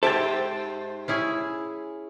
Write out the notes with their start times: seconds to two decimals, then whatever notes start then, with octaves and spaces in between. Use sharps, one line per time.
0.03 G#2 G4 A4 C5 E5 A6
1.08 C#4 E4 G#4